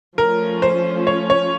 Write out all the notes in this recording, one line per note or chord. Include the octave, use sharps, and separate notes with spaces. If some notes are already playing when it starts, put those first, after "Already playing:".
F3 A3 C#4 F4 A#4
C5
C#5
C#5